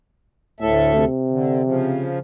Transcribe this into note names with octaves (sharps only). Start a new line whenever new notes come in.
D2 A2 A4 E5
C3
D3
C#3 F3